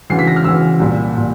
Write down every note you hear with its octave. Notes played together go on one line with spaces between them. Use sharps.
D2 C#3 E3 C7
B6
A#6
F6
D2 C#3 E3 E6
C2 A#2
A#2